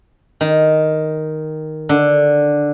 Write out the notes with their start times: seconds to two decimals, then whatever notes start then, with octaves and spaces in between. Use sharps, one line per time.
0.41 D#3
1.89 D3